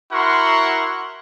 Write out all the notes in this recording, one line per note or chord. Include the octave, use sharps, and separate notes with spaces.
E4 F#4 A#4 F#5 C6 C#6